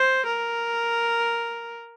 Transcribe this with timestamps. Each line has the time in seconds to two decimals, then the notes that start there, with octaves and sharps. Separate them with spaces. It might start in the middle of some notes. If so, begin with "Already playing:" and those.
Already playing: C5
0.26 A#4